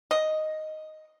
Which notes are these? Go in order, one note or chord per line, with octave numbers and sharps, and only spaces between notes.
D#5